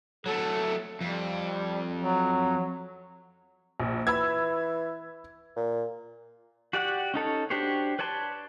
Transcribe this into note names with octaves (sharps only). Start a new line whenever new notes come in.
F#3 A3 A4
F2 G3
F#3
A#1
E3 B5 E6 G#6
A#2
F#4 G4 D5 F#5
C#4 D#4 A4 C#5
D4 F#4 G4 C5 C#5
B4 C#5 D5 A5 C6